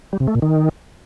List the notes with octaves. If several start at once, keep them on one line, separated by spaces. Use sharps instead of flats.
G3
C3
A3
A#2
D#3